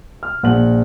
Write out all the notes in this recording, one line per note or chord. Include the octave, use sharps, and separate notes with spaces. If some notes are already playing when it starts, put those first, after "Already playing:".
F6
A#1 F#5 F#7